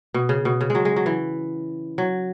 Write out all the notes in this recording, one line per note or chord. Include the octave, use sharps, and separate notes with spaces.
B2
C#3
B2
C#3
G#3
F#3
G#3
F#3
E3
F#3